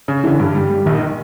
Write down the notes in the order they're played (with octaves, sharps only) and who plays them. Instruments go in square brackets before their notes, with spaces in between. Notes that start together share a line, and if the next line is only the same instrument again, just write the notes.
[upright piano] C#3
[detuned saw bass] D3 [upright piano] E3
[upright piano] G2
G3
G3
[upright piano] A#1 [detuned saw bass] D#3